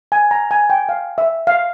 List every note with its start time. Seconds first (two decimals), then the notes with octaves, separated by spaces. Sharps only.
0.12 G#5
0.31 A#5
0.51 G#5
0.70 G5
0.89 F5
1.18 E5
1.47 F5